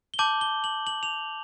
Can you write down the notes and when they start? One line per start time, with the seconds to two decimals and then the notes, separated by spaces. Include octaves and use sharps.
0.14 G7
0.19 A5 D6 G6 F#7
0.41 G7
0.64 F#7
0.87 F#7
1.03 F7